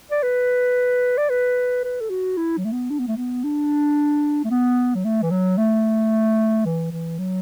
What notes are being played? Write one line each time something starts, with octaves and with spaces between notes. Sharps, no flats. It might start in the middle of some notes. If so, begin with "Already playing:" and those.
D5
B4
D5
B4
B4
A4
F#4
E4
F#3
A3
B3
D4
B3
A3
B3
D4
A3
B3
F#3
A3
E3
F#3
A3
E3
E3
F#3